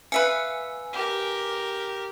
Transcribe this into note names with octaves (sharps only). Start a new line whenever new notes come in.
B4 E5 F5 G#5
G4 A#4